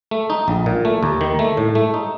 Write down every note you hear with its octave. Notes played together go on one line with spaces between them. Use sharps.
A3
D#4
A#1
A#2
A3
D#2
D#3
A3
A2
A3
D#4